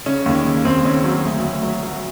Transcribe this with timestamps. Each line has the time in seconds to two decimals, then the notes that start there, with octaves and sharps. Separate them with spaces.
0.06 C#3 C#4
0.26 D#2
0.46 C#3
0.65 D#2 C4
0.84 C#3 C#4
1.04 F#3 C#4
1.25 D2
1.43 D2
1.63 F#3
1.83 F#3